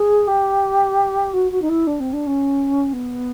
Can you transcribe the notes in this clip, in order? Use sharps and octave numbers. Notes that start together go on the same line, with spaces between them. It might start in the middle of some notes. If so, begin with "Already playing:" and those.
Already playing: G#4
G4
F#4
F#4
D#4
E4
D4
C4
D4
C#4
B3